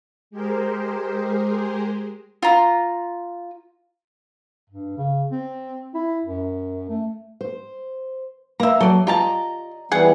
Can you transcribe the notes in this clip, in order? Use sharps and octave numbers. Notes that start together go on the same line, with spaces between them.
G#3 G4 G#4 A#4 C5
F4 A#5
G2
C#3
C4
E4
F#2
A3
C5
A#3 E5 A#5
F#3 A4 D5
F4 G4 D5 D#5 A5 A#5
E3 G3 B3 G#4 F#5